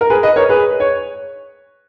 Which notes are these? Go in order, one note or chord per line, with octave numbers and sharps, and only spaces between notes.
A#4
G#4 B4
B4 D#5
A#4 C#5
G#4 B4
C#5